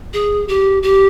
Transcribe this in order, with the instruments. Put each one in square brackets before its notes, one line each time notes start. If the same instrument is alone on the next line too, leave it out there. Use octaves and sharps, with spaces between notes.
[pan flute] G#4
G4
G4